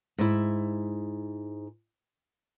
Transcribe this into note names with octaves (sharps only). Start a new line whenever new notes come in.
G#2 E4